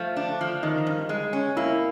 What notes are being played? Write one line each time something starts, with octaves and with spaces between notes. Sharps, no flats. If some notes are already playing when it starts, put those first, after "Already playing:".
Already playing: F3 A3
D4
F3
D#3 D#4
G2
G#3
C#4
A#3 E4